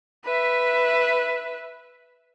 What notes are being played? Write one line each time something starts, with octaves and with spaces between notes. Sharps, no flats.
B4 E5